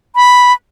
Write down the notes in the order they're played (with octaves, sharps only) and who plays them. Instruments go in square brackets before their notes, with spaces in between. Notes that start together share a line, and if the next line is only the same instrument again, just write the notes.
[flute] B5